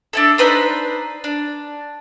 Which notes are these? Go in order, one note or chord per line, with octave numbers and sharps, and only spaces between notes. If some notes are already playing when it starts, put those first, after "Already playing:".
D4 E4 A4
D4 D#4 B4 C5
D4